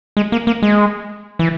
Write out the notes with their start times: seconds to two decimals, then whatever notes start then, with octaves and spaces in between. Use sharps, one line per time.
0.17 G#3
0.32 A#3
0.47 A#3
0.62 G#3
1.39 E3